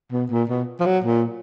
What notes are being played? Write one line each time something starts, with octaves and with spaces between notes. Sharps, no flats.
B2
A#2
B2
F3
F#3
A#2